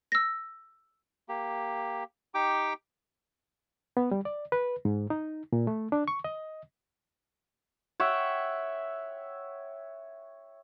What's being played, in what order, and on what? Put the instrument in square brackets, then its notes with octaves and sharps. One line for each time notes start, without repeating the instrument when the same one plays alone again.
[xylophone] E6 A#6
[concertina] A#3 G4
D#4 G4 G5 D6
[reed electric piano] B3
G3
D5
B4
G#2
D#4
A#2
A3
D4
C#6
D#5
[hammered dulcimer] C#5 E5 F#5 G5